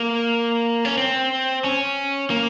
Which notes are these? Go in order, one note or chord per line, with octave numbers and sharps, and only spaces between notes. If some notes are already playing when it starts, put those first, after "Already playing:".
Already playing: A#3
C#4
C4
C#4
A#3